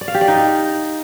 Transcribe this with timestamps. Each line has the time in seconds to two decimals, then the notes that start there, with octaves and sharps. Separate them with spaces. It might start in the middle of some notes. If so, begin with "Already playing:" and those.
0.01 D5
0.08 F5
0.14 G4
0.21 D5
0.28 D#4